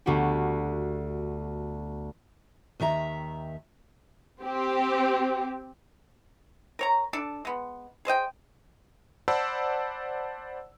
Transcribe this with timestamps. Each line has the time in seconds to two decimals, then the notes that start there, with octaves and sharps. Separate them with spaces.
0.06 D2 D3 B3 F#4 G4
2.80 D#2 D#3 E5 A#5
4.43 C4 G4
6.79 A#4 C#5 A#5
7.13 D4 A4 D5 A5
7.45 G#3 B3
8.05 G#4 C5 D#5 G5
9.28 C5 D5 F#5 A5 B5 E6